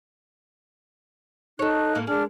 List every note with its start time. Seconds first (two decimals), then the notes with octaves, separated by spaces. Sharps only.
1.59 D#4 A4 C#5 F#6
1.95 A2 A#3
2.07 G#3 D4 G#4 F6